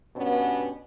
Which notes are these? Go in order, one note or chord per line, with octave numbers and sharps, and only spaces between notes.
G2 B2 B3 C#4